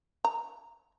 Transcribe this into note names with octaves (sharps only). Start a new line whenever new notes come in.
A#5